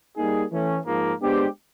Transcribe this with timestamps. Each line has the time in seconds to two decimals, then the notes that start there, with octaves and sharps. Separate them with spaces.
0.16 G3 A#3 D#4 G#4
0.50 E3 A3 C#4
0.85 G#2 F3 A#3
1.19 G#3 B3 D4 G4 C5